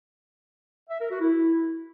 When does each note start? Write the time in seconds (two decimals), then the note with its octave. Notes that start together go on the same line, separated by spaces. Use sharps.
0.90 E5
1.00 A#4
1.10 F#4
1.20 E4